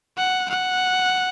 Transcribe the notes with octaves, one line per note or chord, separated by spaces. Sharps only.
F#5
F#5